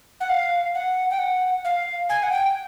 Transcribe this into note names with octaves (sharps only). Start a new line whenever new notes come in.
F#5
F5
F#5
G5
F#5
F5
G#5
F#5
G5